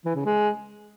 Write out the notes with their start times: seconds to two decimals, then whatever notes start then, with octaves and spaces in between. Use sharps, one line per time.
0.05 E3
0.15 C#3
0.25 G#3